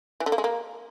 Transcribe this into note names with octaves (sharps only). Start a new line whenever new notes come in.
E3
D3
A#3
G#3
A#3